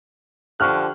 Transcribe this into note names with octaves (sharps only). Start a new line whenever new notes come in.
D3 F3 G4 C#6 F6 F#6